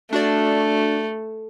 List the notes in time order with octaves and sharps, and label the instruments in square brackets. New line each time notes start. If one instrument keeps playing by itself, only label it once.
[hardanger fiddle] A3 [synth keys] D4 F#4 D5